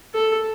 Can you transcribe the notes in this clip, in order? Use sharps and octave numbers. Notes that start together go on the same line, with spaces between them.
A4